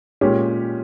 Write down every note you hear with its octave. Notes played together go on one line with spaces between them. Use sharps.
A#2 G#3 C#4 G4